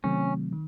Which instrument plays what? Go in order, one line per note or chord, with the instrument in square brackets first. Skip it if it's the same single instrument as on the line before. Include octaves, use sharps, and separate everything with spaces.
[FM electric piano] C3 D#3 F#3 A3 C4 [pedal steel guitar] C#4
[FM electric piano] D#3